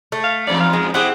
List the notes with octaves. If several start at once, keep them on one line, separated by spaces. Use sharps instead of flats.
A3
F5
E2 G#2 D5
F5
F3 G#3
C4 E4 G4 G#4 F#5